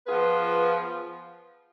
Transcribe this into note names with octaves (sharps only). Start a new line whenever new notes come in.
F3 B3 F4 G#4 B4